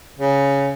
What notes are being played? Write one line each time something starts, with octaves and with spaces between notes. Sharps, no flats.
C#3